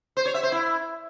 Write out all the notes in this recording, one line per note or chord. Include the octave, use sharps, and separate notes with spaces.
C5
C#5
E5
C5
E4